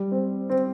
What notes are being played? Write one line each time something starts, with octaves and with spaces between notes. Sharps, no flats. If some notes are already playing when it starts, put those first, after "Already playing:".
Already playing: G3
C4
C4